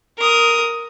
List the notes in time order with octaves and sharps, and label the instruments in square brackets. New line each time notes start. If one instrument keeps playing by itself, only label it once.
[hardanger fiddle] A#4 D#6